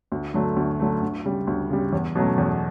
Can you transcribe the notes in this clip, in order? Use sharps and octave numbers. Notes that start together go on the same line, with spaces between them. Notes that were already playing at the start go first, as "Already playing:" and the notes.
D2
D3 F#3 A3
D2
D3 F#3 A3
D2
C#3 G3
D2
C#3 G3
E2
B2 F#3 A3 C#4
E2